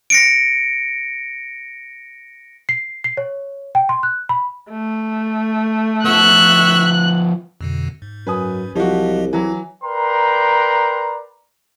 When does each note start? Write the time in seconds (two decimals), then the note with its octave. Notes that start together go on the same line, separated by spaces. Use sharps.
0.10 A#6 C#7 D7
2.69 C7
3.04 C7
3.17 C#5
3.75 G5
3.89 C6
4.03 F#6
4.29 B5
4.70 A3
6.06 F3 B3 C#5 E5 E6 F#6
7.61 F2 B2 D3
8.02 G#2
8.27 F#2 B4 G#5 D#6
8.76 C2 F3 F#3 F#4 G4 D#5
9.33 E3 F#3 E4
9.84 A#4 B4 D5 G5 A#5 C6